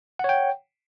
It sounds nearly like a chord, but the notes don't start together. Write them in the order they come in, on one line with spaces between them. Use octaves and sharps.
F#5 C#5 G5